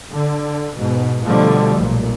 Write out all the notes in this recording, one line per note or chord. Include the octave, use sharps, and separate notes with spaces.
D3
G#2 B2
B2 D3 F3 G3 A3
B1 A#2